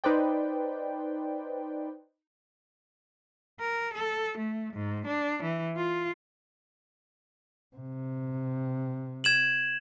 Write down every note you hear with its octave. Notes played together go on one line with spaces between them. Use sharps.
D#4 B4 C5 D5 G5
A#4
A4
A3
G#2
D4
E3
F4
C3
G#6 E7 F#7